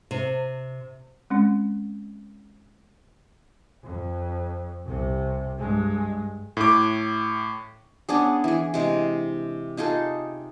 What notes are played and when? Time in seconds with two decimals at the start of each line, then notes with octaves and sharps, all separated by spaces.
0.11 C3
1.30 G#3 C4 C#4
3.83 F2
4.86 C2 C3
5.59 G2 G#3
6.57 A2 D6
8.09 B3 C#4 D4 G#4
8.44 E3 G#4
8.74 C3 G#3
9.77 D#4 F4 G#4 A4